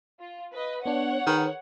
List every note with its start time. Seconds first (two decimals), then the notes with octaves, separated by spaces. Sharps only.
0.19 F4
0.52 B4 D#5
0.86 B3 D4 C#5 F#5
1.27 D#3 G#4 A#4 B4